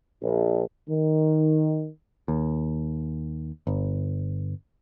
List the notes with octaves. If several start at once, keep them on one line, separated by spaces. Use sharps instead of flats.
A#1
D#3
D#2
G1